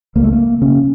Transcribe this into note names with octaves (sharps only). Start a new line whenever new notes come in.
C#2 A#3
A3
A#3
C#3 C#4